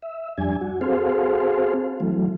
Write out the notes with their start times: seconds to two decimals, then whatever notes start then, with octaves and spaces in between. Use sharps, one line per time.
0.02 E5
0.38 F2 G3 D4 G#5
0.61 F#4
0.81 C4 F#4 G#4 A4 C5 F5
2.00 E3 F#3 A3